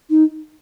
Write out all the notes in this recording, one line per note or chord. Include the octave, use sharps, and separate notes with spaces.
D#4